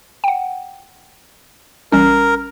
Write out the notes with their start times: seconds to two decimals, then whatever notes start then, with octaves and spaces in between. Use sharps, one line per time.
0.24 F#5 G5
1.92 A1 G3 C#4 A#4